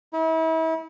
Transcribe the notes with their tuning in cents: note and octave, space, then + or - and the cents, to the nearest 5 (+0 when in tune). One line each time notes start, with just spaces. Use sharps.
E4 -35